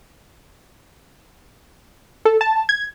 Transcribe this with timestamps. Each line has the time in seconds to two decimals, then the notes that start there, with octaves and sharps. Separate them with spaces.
2.25 A4
2.41 A5
2.69 G#6